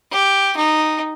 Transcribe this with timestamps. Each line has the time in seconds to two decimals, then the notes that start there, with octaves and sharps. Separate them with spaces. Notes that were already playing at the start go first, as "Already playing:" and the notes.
0.11 G4
0.57 D#4